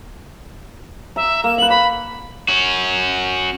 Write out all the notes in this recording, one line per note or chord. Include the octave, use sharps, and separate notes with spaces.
E5 A#5
A#3 E7
B4 F#5 F#7
B5 D6
C#4 F#4